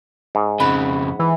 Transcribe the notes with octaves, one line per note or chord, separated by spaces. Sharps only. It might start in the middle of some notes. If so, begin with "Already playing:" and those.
G#2
F2 C#3 F#5 B5
E3